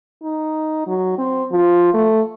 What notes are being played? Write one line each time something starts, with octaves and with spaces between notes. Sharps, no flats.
D#4
F#3
C4
F3
A3